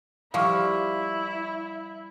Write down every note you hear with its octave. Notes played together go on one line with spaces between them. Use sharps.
F3 G3 E4 F5 C#6 F6